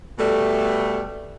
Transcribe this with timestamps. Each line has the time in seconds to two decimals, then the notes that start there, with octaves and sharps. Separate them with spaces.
0.18 B2 G3 A3